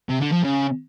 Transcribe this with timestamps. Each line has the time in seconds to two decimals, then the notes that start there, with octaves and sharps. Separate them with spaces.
0.09 C3
0.20 D3
0.32 F3
0.43 C#3